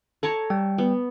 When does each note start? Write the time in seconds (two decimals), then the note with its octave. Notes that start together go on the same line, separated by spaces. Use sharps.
0.23 A4 C#5 A5 A#5
0.50 G3 G5
0.78 B3